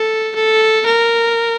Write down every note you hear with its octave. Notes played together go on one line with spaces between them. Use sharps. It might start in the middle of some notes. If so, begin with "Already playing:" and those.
Already playing: A4
A4
A#4